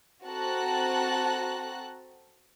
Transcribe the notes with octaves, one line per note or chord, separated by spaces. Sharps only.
C4 F#4 A4 A5 A#5 F#6